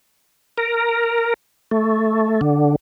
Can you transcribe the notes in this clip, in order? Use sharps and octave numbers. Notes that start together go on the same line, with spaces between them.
A#4
A3
D3